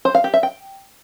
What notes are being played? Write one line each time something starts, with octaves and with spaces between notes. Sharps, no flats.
C5
F5
G4
E5
G5